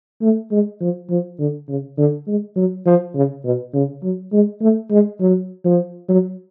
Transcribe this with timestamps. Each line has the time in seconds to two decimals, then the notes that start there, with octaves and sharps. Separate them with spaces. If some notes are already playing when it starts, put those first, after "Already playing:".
0.22 A3
0.51 G#3
0.81 F3
1.10 F3
1.39 D3
1.69 C#3
1.98 D3
2.27 G#3
2.56 F#3
2.86 F3
3.15 C#3
3.44 B2
3.74 C#3
4.03 F#3
4.32 G#3
4.61 A3
4.91 G#3
5.20 F#3
5.65 F3
6.09 F#3